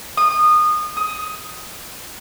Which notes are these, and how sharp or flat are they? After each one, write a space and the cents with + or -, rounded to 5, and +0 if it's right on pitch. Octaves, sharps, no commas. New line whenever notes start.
D#6 -25
D#6 +15